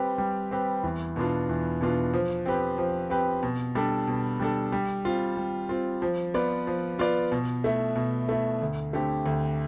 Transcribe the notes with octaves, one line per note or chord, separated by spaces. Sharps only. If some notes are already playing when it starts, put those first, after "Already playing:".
Already playing: G3 C4 G4 B4
G3
C4 G4 B4
E2
B2 B3 D4 F4
E2
B2 B3 D4 F4
F3
C4 G4 B4
F3
C4 G4 B4
B2
G3 D4 A4
B2
G3 D4 A4
G3
C4 F4
G3
C4 F4
F3
B3 F4 B4 D5
F3
B3 F4 B4 D5
B2
A3 E4
B2
A3 E4
D2
D3 A3 C4 G4
D2